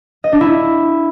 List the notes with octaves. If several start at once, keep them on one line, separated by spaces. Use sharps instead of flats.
D#5
D4
E4